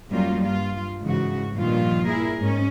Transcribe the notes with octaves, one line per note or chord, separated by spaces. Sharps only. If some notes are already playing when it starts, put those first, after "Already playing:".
F#2 F#3 G3 A#3 F4
G2 F4
G#2 C#3 E3 F#4
G2 A#2 D#3 F3 F4
E4 G#4 A#4
G#2 C#4